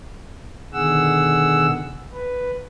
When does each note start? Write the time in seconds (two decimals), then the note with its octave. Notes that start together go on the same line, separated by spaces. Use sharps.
0.73 B2 D3 D#3 G#4 F#5 E6
2.13 B4